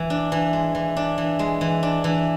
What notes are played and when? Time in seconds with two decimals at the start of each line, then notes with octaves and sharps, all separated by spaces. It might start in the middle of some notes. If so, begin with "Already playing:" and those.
Already playing: E3
0.10 D4
0.32 E3
0.53 G#3
0.75 E3
0.97 D4
1.18 E3
1.39 G#3
1.61 E3
1.83 D4
2.04 E3